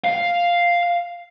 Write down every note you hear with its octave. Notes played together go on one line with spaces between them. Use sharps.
F5